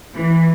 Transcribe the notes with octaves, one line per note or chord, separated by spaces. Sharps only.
E3